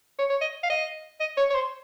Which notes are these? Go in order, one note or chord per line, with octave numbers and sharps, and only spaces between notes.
C#5
C#5
D#5
F5
D#5
D#5
C#5
C#5
C5